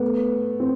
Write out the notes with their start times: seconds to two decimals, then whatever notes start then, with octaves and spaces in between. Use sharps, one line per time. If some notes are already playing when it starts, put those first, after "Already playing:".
Already playing: A3 B3
0.60 C4